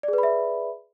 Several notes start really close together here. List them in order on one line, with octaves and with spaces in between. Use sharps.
D5 G#4 B4 B5 E5